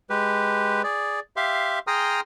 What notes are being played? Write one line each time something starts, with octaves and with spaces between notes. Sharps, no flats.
G#3 G4 B4
G#4 D5
G4 E5 F5 C6
G#4 G5 A#5 C6 D#6 F6